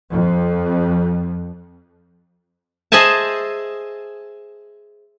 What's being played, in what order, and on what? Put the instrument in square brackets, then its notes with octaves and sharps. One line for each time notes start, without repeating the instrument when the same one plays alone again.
[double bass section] F2
[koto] G#4 C5 D#5 E5 G#5 A5